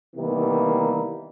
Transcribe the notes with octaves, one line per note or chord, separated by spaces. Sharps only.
C3 D#3 E3 G3 A#3 B3